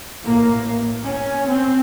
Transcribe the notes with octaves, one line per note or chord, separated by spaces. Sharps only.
A1 A2 A#3
C#4
C4